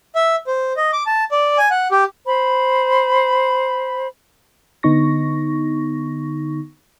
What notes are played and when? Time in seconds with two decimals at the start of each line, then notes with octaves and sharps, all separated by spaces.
0.15 E5
0.47 C5
0.77 D#5
0.93 D6
1.06 A5
1.31 D5
1.58 G#5
1.70 F#5
1.91 G4
2.26 C5 B5
4.83 D3 B3 D#4 C#6 A#6